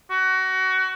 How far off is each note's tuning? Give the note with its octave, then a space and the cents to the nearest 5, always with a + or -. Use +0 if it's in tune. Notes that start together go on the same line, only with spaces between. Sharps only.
F#4 +25